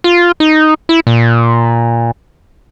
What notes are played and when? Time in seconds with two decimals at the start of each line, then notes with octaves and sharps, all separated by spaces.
0.04 F4
0.40 D#4
0.89 E4
1.07 A#2